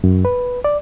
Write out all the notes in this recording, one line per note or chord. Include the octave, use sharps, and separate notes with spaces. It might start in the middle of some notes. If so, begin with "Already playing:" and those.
F#2
B4
D5